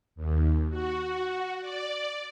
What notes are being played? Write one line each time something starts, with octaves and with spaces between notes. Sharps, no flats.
D#2
F#4
D5